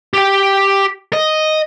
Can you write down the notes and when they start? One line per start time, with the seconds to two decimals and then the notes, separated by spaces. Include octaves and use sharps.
0.14 G4 G5
1.13 D#5